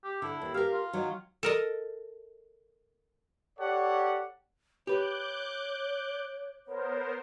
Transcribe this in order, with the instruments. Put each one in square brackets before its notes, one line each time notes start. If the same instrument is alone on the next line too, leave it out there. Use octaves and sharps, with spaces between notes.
[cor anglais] G4
[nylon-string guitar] D3 [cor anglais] E4
[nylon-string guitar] D#2
[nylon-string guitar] G4 A#4 [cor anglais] F5
[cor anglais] F4
[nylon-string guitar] D#3 F#3
[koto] A4 A#4 D#5
[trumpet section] G4 A4 C#5 D5 F#5
[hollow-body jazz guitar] G4 B4 [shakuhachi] C#5 [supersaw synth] D6 F#6 G6
[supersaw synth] B3 A#4 C5 [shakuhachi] C#5